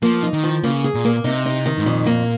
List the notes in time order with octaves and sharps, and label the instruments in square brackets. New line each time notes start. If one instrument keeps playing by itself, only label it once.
[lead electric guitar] F3 [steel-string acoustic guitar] A#3
[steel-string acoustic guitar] D#4
[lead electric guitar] D#3
[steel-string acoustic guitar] F3
[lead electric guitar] C#3 [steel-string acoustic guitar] A#3
[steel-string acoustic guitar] G#4
[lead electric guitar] A#2
[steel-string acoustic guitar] A#3
[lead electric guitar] C3 [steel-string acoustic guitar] D#4
[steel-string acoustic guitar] D#4
D#3
[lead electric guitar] G#2
[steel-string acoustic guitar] F2 [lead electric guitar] A#2
[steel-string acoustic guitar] A#3